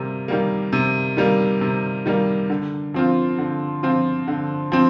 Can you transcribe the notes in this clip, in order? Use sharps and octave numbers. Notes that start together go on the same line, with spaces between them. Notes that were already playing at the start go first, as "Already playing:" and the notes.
Already playing: C3 G3 A#3
D#3 G3 A#3
C3
D#3 G3 A#3
C3
D#3 G3 A#3
D3
F3 C4 F4
D3
F3 C4 F4
D3
F3 C4